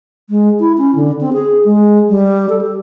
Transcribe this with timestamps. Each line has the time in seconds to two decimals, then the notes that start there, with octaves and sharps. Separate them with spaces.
0.30 G#3
0.60 E4
0.78 C#4
0.95 D3
1.21 C4
1.33 G#4
1.65 G#3
2.09 G3
2.50 A4
2.61 G4